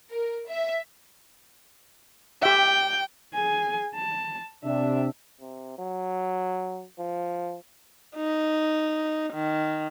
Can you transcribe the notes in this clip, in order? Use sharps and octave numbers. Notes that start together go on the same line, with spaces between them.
A#4
E5
G4 E5 G5
G#4 G#5
A5
C3 D4 E5
C3
F#3
F3
D#4
D#3